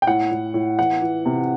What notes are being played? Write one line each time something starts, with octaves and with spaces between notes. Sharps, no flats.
G5
A2 F#5
A2
A2
E3 F#5
E3
C3